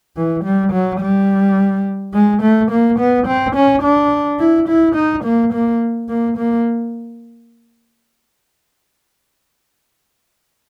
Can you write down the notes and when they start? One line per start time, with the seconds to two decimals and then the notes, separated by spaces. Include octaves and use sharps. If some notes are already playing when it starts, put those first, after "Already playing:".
0.17 E3
0.44 G3
0.73 F#3
1.01 G3
2.13 G#3
2.42 A3
2.71 A#3
2.99 B3
3.27 C4
3.55 C#4
3.83 D4
4.39 E4
4.68 E4
4.95 D#4
5.24 A#3
5.53 A#3
6.09 A#3
6.37 A#3